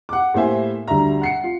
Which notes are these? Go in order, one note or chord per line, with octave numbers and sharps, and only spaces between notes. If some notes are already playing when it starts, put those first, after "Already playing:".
F#5 D6
A2 A#3 G4 C5 E5 G#5
D2 F#3 G3 E5 A#5
F#5 C7 C#7
F4